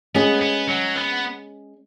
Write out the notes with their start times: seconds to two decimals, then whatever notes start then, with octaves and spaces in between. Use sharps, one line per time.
0.15 G#3 B3 C#4 G#4
0.41 B3
0.69 F#3
0.96 B3